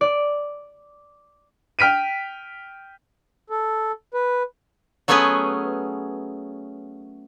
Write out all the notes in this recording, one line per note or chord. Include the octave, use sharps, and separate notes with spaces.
D5
G5 F6 B6 D7 D#7
A4
B4
F#3 A3 B3 C#4 G#4 B4